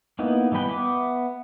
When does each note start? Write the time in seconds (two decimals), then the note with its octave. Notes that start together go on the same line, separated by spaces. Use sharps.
0.19 A#3 B3 D#4 E4
0.52 E3 G3 B3 B4 G5
0.69 B3 E5 D6